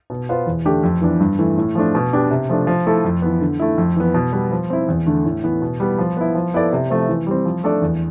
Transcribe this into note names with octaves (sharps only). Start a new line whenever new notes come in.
B2
B3 F4 C5
E2
D3 A3 D4 G4
F2
E3 B3 D4
G2
E3 A3
A2
F3 A3 D4
B2
B3 D4 G4
C3
F3 A3 D4
F3
A3 E4 A4
F2
E3 B3
D3
A3 E4
F2
E3 B3
B2
G3 B3
F3
C4 E4
E2
D3 A3
A2
E3 B3
B2
G3 B3
F3
B3 E4
F3
B3 E4 A4 D5
C3
F3 A3 C4
E3
G3 C4
F3
A3 D4 A4 D5
E2